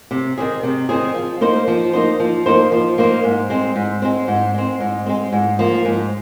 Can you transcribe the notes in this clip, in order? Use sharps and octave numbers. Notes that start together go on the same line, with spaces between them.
C3
D#3 C4 G#4
C3
D#3 C4 G#4
F3
A#3 D#4 C5
F3
A#3 D#4 C5
F3
A#3 D#4 C5
F3
A#3 D#4 C5
G#2
G#3 C4
G#2
G#3 C4
G#2
G#3 C4
G#2
G#3 C4
G#2
F3 A#3
G#2